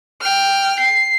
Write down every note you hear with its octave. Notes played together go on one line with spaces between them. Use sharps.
G5 F6
C7